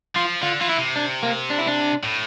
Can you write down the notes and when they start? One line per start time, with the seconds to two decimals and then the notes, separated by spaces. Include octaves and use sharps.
0.16 F3 F4
0.42 D3 F4
0.60 E3 F4
0.69 E4
0.78 C3
0.96 D4
1.23 A#3
1.50 D4
1.58 E4
1.67 D4
2.04 A2